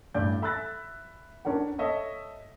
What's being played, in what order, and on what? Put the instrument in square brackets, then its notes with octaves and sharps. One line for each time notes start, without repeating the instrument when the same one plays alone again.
[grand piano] A1 G2 D5 G6
E5 B5 E6 F#6 A6 A#6
C#4 D4 A#4 D5 F#5
A4 C#5 D#5 E5